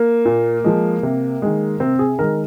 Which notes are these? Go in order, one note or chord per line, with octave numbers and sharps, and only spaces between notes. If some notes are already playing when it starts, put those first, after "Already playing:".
Already playing: A#3
A#2
F3 G#3
C3
D#3 G#3
C3 C4
G#4
D#3 G#3 A#4